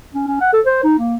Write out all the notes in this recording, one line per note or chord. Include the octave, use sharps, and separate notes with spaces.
C#4
C#4
F#5
A4
C5
D#4
A#3